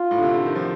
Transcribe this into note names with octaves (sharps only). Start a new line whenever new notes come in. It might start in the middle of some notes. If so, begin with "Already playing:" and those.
Already playing: F4
A2
D3
C3
D3
D#3
F3